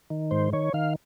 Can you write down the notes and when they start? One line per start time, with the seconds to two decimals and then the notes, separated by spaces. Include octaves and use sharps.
0.10 D#3
0.31 G#2 C5
0.53 D#3 C#5
0.73 D#3 F5